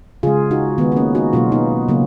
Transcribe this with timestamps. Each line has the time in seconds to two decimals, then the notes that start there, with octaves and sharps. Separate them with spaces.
0.23 C#3 G#3 F4 G#4
0.51 D#4 F#4
0.78 D#3 B3
0.81 G#3
0.92 D#4
0.96 A#3 C#4
1.15 D#4 F#4
1.33 B2 F#3 A#3 C#4 F4
1.52 B3 D#4
1.88 C#3 F#3 A#3